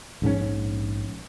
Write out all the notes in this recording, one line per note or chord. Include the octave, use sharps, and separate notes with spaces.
A#1 G#2 C#3 C#4